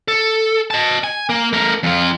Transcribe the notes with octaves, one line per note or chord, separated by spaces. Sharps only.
A4
D#5 A5
G#5
A#3
A3 A#4
F2 F4